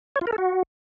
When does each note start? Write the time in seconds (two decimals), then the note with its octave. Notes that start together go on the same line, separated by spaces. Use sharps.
0.16 C#5
0.21 F4
0.27 A#4
0.33 A4
0.38 F#4